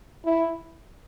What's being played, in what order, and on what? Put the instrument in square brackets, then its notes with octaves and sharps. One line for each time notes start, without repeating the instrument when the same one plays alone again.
[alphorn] E4